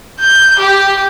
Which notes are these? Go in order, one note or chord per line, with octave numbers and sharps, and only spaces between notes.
G6
G4